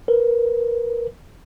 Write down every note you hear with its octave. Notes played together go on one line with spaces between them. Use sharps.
A#4 B4